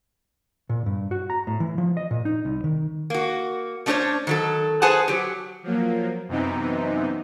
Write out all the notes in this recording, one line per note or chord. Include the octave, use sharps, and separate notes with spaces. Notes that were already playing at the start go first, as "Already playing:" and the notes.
A#2
G2
F#4
A#5
A2
E3
F3
D#5
A#2
D#4
C2
D#3
A#3 F#4
A3 C#4 D4 A4 C5 C#5
D#3 F#3 A4
G#4 B4 C5 F#5 G#5 A5
F#3 G4
F3 F#3 A#3
F#2 C3 E3 B3 C4 D#4